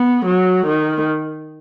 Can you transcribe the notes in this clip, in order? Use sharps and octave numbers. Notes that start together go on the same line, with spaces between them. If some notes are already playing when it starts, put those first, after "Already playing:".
Already playing: B3
F#3
D#3